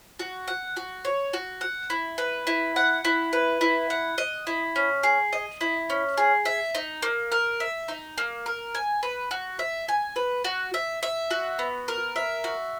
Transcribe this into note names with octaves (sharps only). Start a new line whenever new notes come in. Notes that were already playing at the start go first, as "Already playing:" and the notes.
F#4
F#5
F#4
C#5
F#4
F#5
E4
B4
E4
F#5
E4
B4
E4
F#5
D#5
E4
C#4
G#4
D#5
E4
C#4
G#4
E5
D#4
A#3
A#4
E5
D#4
A#3
A#4
G#5
B4
F#4
E5
G#5
B4
F#4
E5
E5
F#4
B3
A#4
E5
F#4